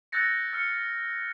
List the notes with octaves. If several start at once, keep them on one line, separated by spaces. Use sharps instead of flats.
E6 F#6 G6 A6 A#6 C#7
E6 F6 C#7